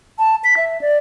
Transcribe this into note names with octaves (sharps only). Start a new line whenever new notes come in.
A5
B6
E5
D5